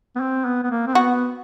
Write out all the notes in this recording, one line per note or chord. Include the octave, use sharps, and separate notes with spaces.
B3
C4
B3
B3
A#3
C4
B3 F#4